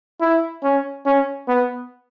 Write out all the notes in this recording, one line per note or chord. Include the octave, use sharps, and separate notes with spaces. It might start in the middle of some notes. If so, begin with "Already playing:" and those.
E4
C#4
C#4
B3